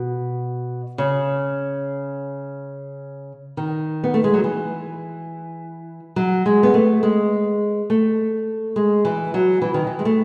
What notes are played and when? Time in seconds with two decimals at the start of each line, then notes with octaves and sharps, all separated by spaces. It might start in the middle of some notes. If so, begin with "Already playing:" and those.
Already playing: B2
0.98 C#3
3.57 D#3
4.04 B3
4.14 A3
4.24 G#3
4.34 F#3
4.44 E3
6.16 F#3
6.46 G#3
6.63 B3
6.74 A3
7.03 G#3
7.90 A3
8.76 G#3
9.05 E3
9.34 F#3
9.62 E3
9.74 D#3
9.87 E3
9.99 G#3
10.05 A3